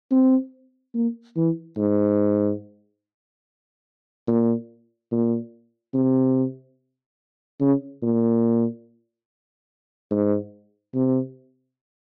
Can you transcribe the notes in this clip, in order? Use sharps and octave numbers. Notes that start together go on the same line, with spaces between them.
C4
A#3
E3
G#2
A#2
A#2
C3
C#3
A#2
G#2
C3